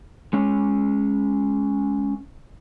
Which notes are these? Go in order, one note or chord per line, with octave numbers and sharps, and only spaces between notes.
G#3 C#4